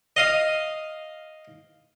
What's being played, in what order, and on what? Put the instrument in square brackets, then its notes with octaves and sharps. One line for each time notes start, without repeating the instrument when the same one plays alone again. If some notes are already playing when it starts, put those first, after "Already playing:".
[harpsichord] D#5 F5 D#6